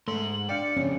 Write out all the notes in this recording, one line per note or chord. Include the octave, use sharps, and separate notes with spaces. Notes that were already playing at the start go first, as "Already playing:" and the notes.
G#2 A3 C6 F#7
D4 D5 F5 G5 C#7
F2 C#3 C#4